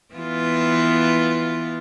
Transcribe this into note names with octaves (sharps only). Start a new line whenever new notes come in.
E3 B3 F4